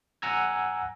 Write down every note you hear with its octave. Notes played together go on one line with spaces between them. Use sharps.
F#5 G#5 A#5 E6 G#6